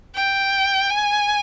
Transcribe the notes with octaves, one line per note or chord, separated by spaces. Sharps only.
G5
G#5